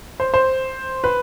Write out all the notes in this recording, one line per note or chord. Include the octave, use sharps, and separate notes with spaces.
C5
C5
B4